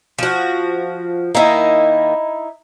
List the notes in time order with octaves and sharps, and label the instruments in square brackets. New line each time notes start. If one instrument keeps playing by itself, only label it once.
[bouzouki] F3 F#4
[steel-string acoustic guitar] D#3 A#3 [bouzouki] D#4 E4